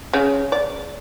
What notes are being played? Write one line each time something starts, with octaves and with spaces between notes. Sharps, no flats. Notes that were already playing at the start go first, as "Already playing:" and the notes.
C#3
D5